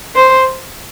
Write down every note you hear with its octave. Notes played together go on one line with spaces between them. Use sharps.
C5